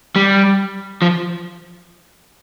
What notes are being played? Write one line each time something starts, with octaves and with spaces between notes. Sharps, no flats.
G3
F3